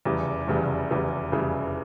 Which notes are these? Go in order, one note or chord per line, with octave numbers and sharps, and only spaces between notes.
F1 E2 C#3 E3 G3
F1 E2 C#3 E3 G3
F1 E2 C#3 E3 G3
F1 E2 C#3 E3 G3